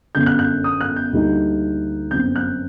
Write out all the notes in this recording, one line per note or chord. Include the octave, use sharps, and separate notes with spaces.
G1 F#2 D3 G6
F#6
F#6
D#6
F#6
G6
D2 D3 G3 A#3 D#4
G1 F#2 F#3 C4 G6
F#6